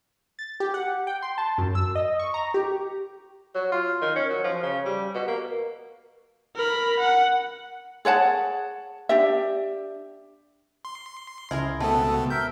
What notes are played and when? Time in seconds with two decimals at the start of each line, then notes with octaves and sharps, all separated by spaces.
0.39 A6
0.60 G4
0.74 F#5
1.07 G5
1.22 C6
1.38 A5
1.58 F#2
1.75 E6
1.95 D#5
2.20 C#6
2.34 A#5
2.54 G4
3.55 F#3
3.72 F4
4.02 D#3
4.16 C#4
4.30 F#3
4.44 F3
4.63 C#3
4.86 G3
5.15 B2
5.28 A#3
6.56 A#4 B5
6.99 F#5
8.05 G#4 C#5 F#5 A5
9.09 D4 G4 E5
10.85 C6
11.51 C#2 E4 G#4 A#4
11.80 B2 A3 B3 C4 A4
12.30 A#4 E5 G6